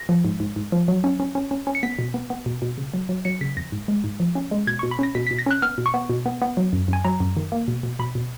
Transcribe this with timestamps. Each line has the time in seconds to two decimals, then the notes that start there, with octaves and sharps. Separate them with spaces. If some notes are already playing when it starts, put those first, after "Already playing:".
Already playing: A#6
0.09 F3
0.25 G#2
0.40 G#2
0.56 G#2
0.72 F3
0.88 F#3
1.04 C#4
1.20 C#4
1.35 C#4
1.51 C#4
1.67 C#4
1.75 C#7
1.83 B3 B6
1.99 B2
2.14 B3
2.30 B3
2.46 B2
2.62 B2
2.78 C#3
2.94 F#3
3.09 F#3
3.25 F#3 C#7
3.41 C#3 B6
3.57 F2 A#6
3.72 G#2
3.88 G#3
4.04 G#2
4.20 F3
4.35 C#4
4.51 G#3
4.67 B2 G#6
4.79 C#6
4.83 B2
4.91 B5
4.99 C#4 A#6
5.15 B2 B6
5.27 B6
5.31 B2
5.39 A#6
5.46 C#4 F#6
5.62 B3 F6
5.78 B2
5.86 C#6
5.94 B3
6.10 B2
6.26 B3
6.42 B3
6.57 F#3
6.73 F#2
6.88 F#2 G#5
7.05 F#3 A#5
7.20 F#2
7.37 D#3
7.52 A#3
7.68 B2
7.83 B2
7.99 B2 B5
8.15 B2